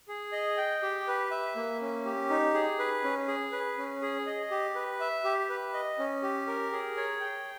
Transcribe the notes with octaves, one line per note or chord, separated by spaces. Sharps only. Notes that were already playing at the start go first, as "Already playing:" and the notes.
G#4
D#5
G5
G4
B4
E5
A#3
C#4
G4
D#4
G#4
B4
C#4
G#4
B4
C#4
G#4
D#5
G4
B4
E5
G4
B4
D#5
C#4
G4
A#4
G#4
C#5
G5